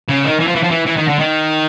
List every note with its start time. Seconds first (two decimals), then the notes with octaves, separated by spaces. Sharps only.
0.09 C#3
0.25 D#3
0.40 E3
0.48 F3
0.56 E3
0.63 F3
0.71 E3
0.87 E3
0.98 D#3
1.09 D3
1.20 D#3